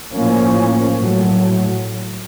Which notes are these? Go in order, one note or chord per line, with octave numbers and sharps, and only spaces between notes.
A2 F3 A#3 C#4
A2 F#3 A3